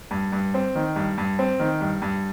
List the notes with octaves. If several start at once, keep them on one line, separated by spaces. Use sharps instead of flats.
G2
G2
C4
D#3
G2
G2
C4
D#3
G2
G2